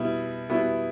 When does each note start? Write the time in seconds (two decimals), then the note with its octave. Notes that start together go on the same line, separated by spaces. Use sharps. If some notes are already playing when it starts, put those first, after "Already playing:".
Already playing: B2 G3 B3 E4
0.49 B2 G3 B3 E4